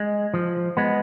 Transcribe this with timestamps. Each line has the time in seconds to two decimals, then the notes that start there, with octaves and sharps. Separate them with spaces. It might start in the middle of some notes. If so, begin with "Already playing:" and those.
Already playing: G#3
0.34 F3
0.77 G#3 B3